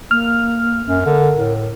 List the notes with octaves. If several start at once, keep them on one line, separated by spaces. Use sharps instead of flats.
A#3 F6
F#2 C#4
D3 A#4
A2